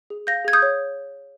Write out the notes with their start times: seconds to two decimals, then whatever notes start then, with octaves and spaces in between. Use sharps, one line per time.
0.10 G#4
0.27 F5 G6 A#6
0.45 G#4 G#6
0.53 D#6 G6
0.62 C#5